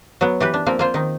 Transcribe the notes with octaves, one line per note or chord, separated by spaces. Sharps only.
F#3 B3
E3 G4 B4
D4
F3 A#3 C4
A#3 F4 C5
D#3 D#4